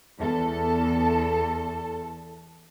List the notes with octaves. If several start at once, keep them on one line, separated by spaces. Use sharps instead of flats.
E2 A4